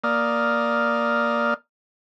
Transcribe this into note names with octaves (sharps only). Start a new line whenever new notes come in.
A#3 D5 D#6 F6